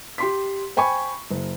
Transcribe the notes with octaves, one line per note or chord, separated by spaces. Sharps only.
G4 C6 B6
C5 G5 G#5 B5 C#6
F#1